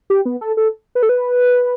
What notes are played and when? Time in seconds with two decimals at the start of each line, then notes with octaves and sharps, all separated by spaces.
0.10 G4
0.25 B3
0.41 A4
0.57 A4
0.95 B4
1.03 A4
1.09 B4